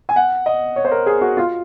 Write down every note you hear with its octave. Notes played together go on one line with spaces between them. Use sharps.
G#5
F#5
D#5
C#5
C5
A#4
G#4
F#4
F4